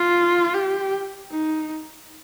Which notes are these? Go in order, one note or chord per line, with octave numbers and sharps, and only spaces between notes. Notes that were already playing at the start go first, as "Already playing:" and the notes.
Already playing: F4
G4
D#4